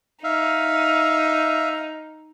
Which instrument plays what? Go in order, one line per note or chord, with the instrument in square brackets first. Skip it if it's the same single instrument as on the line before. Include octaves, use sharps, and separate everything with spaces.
[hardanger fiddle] D#4 [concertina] E5 F5